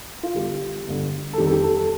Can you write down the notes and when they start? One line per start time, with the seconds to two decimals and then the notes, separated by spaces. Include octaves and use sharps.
0.23 F4
0.35 G1 G2 D3 G4
0.87 G1 G2 D3
1.33 A4
1.38 F2 D#3 G3 G4
1.47 A4
1.51 G4
1.64 A4
1.77 A4